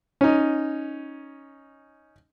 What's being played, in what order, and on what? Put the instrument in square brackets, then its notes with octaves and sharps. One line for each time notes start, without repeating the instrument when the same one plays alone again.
[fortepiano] C#4 D#4